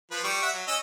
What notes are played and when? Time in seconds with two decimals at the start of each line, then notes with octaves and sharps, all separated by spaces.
0.11 F3 B4
0.24 G3 C#6
0.42 E5 F#5
0.54 F#3
0.67 C#4 D#5 E6